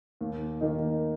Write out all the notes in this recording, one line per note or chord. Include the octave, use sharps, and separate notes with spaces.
D#2
D#3 A#3 D#4